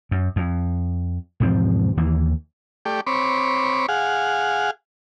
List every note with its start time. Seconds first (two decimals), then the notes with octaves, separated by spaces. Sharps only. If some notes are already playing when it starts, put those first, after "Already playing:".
0.11 F#2
0.36 F2
1.40 E1 G#2 F3 C4
1.97 D#2 E3 A#3
2.85 A3 G4 D5
3.07 C4 C#5 B5 D6
3.89 G#4 F5 F#5